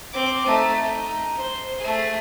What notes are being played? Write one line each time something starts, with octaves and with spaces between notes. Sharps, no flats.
C4 D6
A3 D#4
D#4
C5
A3 G#4